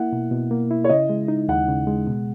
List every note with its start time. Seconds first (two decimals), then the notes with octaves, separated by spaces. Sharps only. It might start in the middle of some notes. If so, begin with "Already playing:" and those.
Already playing: A#3 E4 F#5
0.13 B2
0.31 B2
0.51 A#3
0.71 E4
0.84 C#5
0.89 C#3 D#5
1.10 G#3
1.28 D#4
1.48 D#2 F#5
1.68 C#3
1.87 G#3
2.07 B2